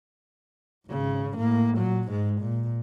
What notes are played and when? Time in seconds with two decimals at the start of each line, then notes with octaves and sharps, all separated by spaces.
0.87 G#1 C#3
1.37 A2 A#3
1.77 A#2 F#3
2.08 G#2 G#3
2.41 A#2